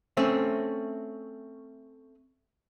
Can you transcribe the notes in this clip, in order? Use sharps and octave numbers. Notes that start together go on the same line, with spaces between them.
A3 C4 C#4